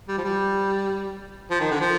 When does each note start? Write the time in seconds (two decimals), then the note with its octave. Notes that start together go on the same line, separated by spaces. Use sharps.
0.08 G3
0.18 F3
0.24 G3
1.50 F3
1.60 D#3
1.71 D3
1.81 F3